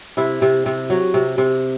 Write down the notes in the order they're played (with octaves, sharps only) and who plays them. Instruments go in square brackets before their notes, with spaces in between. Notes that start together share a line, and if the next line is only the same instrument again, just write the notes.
[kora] C3 E4
C3
C3
F#3
C3
C3